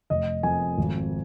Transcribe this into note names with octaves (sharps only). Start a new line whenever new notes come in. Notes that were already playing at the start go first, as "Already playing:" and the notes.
F1 D#5
F2 G#5
G#1